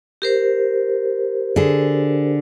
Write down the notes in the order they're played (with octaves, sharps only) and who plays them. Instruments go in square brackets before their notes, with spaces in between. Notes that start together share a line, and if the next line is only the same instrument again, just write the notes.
[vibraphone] G4 A#4 C5
[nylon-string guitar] D3 G#4